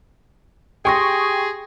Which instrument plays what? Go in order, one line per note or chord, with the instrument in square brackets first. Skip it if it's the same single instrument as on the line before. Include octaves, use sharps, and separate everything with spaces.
[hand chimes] G4 C6 A#6 [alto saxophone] G#4 [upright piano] G5 C#6 D#6